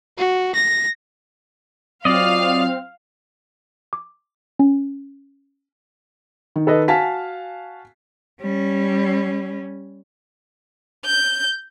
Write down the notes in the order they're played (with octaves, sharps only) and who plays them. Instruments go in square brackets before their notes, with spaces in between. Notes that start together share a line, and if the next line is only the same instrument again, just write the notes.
[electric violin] F#4
A#6
[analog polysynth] F#3 F4 [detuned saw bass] C4 [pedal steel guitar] D5 D#5 [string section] F5
[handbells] D6
C#4
[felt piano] D#3
[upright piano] A4 B4 D#5
[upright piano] F#4 F5 [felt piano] G#5 A5 B6
[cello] G3 C#4
[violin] G6